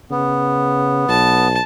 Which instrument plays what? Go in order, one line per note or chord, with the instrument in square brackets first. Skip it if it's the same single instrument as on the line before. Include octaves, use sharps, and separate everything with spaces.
[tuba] C#3 [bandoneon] B3
[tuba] B1 [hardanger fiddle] A5